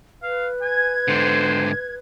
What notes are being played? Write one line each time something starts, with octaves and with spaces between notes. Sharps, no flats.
B4 F5
G#5 G#6
G#2 D3 C5